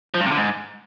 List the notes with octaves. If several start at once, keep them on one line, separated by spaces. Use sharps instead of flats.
F3
G2
C3
D3
G#2